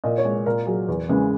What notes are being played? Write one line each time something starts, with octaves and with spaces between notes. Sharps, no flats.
A#2 D#5
C#5
G#3
A#2 A#4
F#3 G#4
E2
C#3 E3 G#3